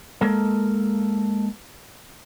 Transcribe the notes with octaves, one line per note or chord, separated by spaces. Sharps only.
G#3 A#3 A4 A#4